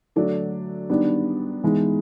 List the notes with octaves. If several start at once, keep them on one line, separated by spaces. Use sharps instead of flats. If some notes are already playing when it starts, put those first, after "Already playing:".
D3 F#3 A3 D4
D#3 G3 B3 D4
E3 G#3 B3 D#4